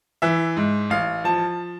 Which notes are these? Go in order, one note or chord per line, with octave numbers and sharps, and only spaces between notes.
E3 E5
G#2
A1 F5
F3 A5